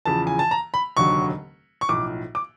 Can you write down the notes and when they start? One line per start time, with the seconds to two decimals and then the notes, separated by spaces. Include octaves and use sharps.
0.05 E2 C#3 F3 A5
0.27 G#5
0.39 A5
0.51 A#5
0.74 B5
0.97 F1 D#2 D3 F#3 C#6
1.81 C#6
1.89 B1 A2 F3 D6
2.35 D6